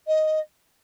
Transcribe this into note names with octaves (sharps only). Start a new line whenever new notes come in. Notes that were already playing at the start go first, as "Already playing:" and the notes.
D#5